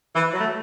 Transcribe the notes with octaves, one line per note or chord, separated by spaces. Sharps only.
E3 E4
F#3
A3